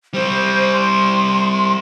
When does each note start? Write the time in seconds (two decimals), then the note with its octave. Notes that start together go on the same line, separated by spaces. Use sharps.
0.14 G3 C4 C5
0.73 C6